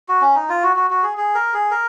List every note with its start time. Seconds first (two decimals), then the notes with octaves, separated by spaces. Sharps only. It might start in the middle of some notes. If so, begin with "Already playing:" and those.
0.09 F#4
0.21 C#4
0.35 D#4
0.49 F4
0.63 F#4
0.76 F#4
0.90 F#4
1.03 G#4
1.18 G#4
1.35 A#4
1.54 G#4
1.71 A#4